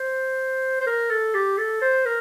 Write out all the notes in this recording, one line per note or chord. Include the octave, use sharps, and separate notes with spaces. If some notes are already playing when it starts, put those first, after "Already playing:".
Already playing: C5
C5
A#4
A4
G4
A4
C5
A#4